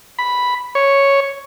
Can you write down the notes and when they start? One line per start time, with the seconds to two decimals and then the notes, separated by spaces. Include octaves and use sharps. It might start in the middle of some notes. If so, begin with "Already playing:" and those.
0.19 B5
0.75 C#5